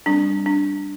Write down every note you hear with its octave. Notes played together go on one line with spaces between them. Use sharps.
G3 C4 D4
D4